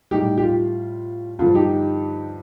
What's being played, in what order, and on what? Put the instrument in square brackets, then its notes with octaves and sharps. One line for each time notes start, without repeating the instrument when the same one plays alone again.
[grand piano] A2 G3 D#4 G4
G4
F4
G2 D3 F3 F4
D#4 G4